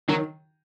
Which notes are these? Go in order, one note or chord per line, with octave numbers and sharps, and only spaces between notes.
D#3 F#3